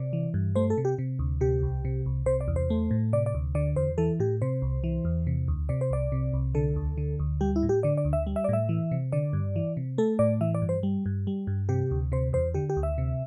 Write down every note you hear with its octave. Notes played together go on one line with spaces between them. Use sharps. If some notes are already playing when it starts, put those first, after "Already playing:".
Already playing: C3 D5
E3
G2
A3 C5
A4
C3
G4
C3
D2
C3 G4
C2
C3
C2
C3 C5
D5
E2
C5
A3
A2
C3 D5
D5
D2
D3 D5
E2 C5
E3 A4
A2 G4
C3 C5
C2
E3
E2
C3
D2
C3 D5
C5
C2 D5
C3
C2
D3 A4
D2
D3
D2
G3 G4
E4
A2
G4
D3 D5
D5
D2
E5
G3
E5
D5
A2 E5
E3
C3
D3 D5
G2
E3
C3
A3 A4
A2 D5
E3 E5
D5
G2
C5
G3
G2
G3
G2
C3 G4
D2
C3 C5
E2 C5
D3 G4
G4
D2
E5
C3